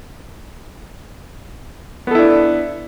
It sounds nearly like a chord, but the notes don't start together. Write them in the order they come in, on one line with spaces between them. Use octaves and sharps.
B3 A4 E4 D4